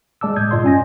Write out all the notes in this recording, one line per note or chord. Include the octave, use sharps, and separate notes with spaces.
G#3 D5 A5 D6 E6
A2 D#6 G6 G#6
G2 A#2 F4 D5 D#5 C6
C#4 G#5 A#6